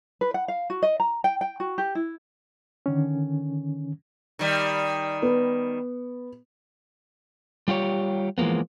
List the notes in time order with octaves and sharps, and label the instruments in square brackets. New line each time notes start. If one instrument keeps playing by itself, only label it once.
[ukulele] B4
F#5
F5
F#4
D#5
A#5
G5
G5
F#4
G4
E4
[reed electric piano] D3 D#3 C#4
[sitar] D#3 G3
[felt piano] B3
[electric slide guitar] G3 F4 G4 C#5
E3 F3 G#3 A#3 B3